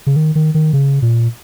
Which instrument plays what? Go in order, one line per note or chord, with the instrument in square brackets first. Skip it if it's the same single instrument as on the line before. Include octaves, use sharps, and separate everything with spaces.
[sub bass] C#3
D#3
D#3
D#3
C#3
A#2